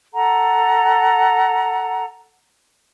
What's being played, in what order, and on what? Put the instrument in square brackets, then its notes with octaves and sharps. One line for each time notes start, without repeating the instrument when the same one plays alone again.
[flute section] A4 F#5 A#5